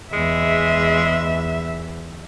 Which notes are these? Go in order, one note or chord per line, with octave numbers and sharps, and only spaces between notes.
E2 G#3 E5